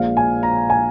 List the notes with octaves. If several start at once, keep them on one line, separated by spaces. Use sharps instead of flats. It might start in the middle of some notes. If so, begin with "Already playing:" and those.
Already playing: A#1 A#2 F3 G#3 F5
G#5
A#5
G#5